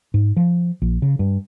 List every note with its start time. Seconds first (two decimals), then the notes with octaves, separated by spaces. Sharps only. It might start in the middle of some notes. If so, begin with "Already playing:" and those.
0.14 G#2
0.37 F3
0.82 A#1
1.02 C#3
1.19 G2